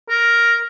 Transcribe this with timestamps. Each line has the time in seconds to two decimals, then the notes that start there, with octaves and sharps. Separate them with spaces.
0.10 A#4